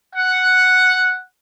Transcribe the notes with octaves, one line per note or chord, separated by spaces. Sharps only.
F#5